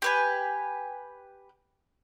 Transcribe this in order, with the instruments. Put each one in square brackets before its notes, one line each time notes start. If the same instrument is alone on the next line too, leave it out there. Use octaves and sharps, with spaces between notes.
[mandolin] G4 B4 G#5